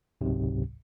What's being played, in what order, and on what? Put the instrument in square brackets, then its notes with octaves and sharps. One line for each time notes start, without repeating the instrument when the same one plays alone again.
[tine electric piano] G1 C#2 G#2 C3 F#3